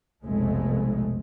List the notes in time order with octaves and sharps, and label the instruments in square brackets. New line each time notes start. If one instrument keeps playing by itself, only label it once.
[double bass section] F1 B1 F2 G#3 A3